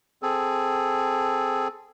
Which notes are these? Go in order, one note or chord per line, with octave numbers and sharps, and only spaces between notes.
C4 G#4 A4